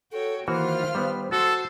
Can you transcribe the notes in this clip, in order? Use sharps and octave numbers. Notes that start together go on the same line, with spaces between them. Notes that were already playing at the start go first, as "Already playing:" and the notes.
F#4 A4 C#5 G5
D#3 E3 A#3 F4 F#4 C5 F6
G3 B3
F#4 A4 C5 C6